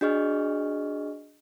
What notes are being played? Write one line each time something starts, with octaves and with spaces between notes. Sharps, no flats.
D4 F#4 G#4 D#5 C#6 F6